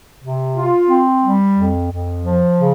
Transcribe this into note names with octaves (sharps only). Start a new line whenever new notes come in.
C3
F4
C4
G3
F2
F2
F3
C#3